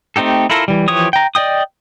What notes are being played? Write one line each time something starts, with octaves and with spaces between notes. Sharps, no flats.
A3 C4 D#4 G4 A4
E4 F4 A4 A#4
E3 G3
E3 F3 G4 C#5 D#6
G5 A#5
D5 D#5 G5 D#6